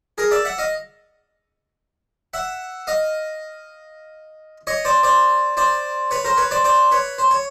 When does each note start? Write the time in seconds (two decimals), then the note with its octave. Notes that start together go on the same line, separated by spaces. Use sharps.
0.18 G#4 A#4
0.31 D5 E5
0.45 E5 F#5
0.58 D#5 F5
2.34 E5 F#5
2.87 D#5 F5
4.67 C#5 D#5
4.85 C5 D5
5.03 C5 D5
5.57 C5 D5
6.11 B4 C#5
6.25 A#4 C5
6.37 B4 C#5
6.51 C5 D5
6.64 C5 D5
6.91 B4 C#5
7.18 C5
7.31 C#5